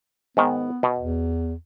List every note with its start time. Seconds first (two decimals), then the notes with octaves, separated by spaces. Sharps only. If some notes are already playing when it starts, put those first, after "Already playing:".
0.37 G#2 D#3 B3
0.83 B2
0.98 E2